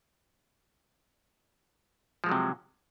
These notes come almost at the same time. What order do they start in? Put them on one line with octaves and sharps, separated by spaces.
F3 G#3 F#3 C3